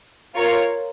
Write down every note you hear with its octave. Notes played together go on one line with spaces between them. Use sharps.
F4 A#4 C#5